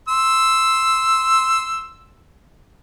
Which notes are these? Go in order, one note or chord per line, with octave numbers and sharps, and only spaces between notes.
C6 E6